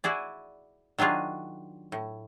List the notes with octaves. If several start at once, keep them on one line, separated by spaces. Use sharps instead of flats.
E4 F#4 G#4 D5
D#3 F#3 D4 F4 G#4
A2